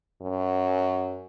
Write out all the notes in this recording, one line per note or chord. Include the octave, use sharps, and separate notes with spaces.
F#2